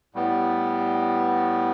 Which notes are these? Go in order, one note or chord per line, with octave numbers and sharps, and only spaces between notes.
A2 G3 B3